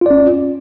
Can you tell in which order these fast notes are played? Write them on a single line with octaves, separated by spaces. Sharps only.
F4 D5 C#4